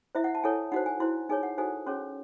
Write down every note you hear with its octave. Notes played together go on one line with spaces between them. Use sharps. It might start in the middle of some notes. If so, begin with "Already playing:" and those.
E4 C5 E5
F#5
A5
E4 A4 C#5 G#5
D#4 F#4 C5 F#5
G#5
E4 C5 C6
D#4 G#4 C#5 G#5
F#5
D#4 F#4 A4 C5 G#5
C#4 G#4 C#5 C6